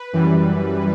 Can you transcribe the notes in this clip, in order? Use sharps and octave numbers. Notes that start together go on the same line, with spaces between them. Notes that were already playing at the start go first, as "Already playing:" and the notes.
Already playing: B4
F#2 E3 G3